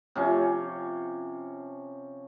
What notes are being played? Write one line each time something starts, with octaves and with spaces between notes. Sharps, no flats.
C3 F3 C#4